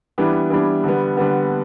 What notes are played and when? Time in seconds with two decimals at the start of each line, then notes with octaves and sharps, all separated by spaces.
0.18 E3 G3 B3 D4
0.50 E3 G3 B3 D4
0.84 D3 G3 B3
1.17 D3 G3 B3